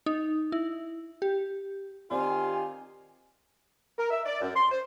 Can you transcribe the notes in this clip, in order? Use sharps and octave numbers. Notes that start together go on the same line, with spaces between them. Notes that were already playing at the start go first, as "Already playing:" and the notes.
D#4
E4
G4
D#3 C4 F4 G4 C5 D5 G#5
A#4
E5
D5
F#2
C6
C5